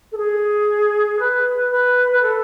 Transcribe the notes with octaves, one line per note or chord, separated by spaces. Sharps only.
A4
G#4
B4
B4
B4
A4